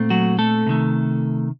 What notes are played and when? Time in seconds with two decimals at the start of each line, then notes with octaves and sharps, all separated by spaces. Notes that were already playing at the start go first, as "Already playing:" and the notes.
Already playing: A#2 A3 C4
0.10 F#3 F#4
0.39 A3 A4
0.67 C3 D#3 A3